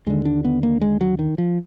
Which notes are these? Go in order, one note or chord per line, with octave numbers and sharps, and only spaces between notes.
D#2 D3 G#3
D4
B3
A#3
G#3
F#3
D#3
F3